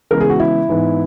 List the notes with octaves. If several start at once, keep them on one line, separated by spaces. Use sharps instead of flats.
C#3 E3 G#3 B3 A#4
G#4
F#4
E4
G#2 E3 B3